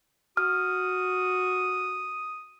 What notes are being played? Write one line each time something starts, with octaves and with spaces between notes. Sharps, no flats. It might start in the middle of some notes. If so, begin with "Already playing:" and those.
F#4 D#6 F6